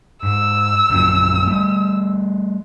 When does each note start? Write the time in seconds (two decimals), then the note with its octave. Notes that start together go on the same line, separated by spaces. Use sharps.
0.23 G#2 E6
0.90 A#1 F#2 A#2
1.47 G3 A3